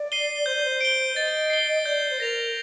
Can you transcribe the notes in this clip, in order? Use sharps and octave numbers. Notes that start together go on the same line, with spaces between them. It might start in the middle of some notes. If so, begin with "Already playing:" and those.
Already playing: D5
C7 D#7 G7
C5 G6
D5
C5
D7 G7
D#5 A6
C7 G7
D5 G6
D5
C5
A#4 A#6 F7